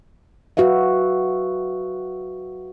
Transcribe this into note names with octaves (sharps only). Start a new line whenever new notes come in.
F#4 B4 E5 F5